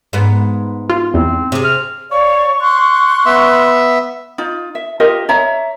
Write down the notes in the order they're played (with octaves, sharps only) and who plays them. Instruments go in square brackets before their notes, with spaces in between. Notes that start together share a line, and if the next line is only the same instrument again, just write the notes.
[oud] G#2 B3
[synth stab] F4
[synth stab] E2 [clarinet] C4
[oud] C3 G#4
[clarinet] F6
[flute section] C#5 D5 F5 [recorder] C#6
[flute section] C6 F#6
[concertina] B3 E5
[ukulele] D#4 F4
E5
F4 G4 A#4 D#5
C#5 E5 A#5